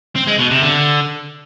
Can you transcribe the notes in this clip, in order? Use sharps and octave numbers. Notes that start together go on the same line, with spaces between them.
C4
G#3
B2
C3
D3